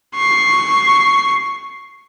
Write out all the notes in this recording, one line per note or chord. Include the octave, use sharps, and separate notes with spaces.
C#6 C7